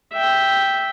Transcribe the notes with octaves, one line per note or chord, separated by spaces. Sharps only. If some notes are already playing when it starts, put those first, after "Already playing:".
E5 G5